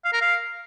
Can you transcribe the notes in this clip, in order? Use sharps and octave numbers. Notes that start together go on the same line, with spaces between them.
F5
A#4
F5